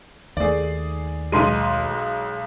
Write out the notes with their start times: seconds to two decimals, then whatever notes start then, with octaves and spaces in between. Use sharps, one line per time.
0.37 D#2 A3 G#4 D5
1.32 B1 G#3 C6 D#7